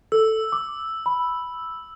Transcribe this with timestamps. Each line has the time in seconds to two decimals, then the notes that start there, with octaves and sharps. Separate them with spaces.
0.12 A4 E6
0.52 D6
1.06 B5